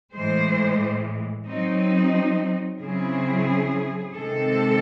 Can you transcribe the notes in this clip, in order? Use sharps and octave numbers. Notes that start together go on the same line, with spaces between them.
A2 E3 G#3 C5
F#3 C4 D#4
C#3 F#3 C4 E4 G#4
C3 D#3 G#3 C4 A4